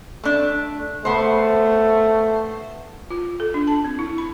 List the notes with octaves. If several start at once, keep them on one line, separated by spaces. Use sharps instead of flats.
A3 D4
A3 B3 C5
F4
A4
D4
A5
C4
E4
B5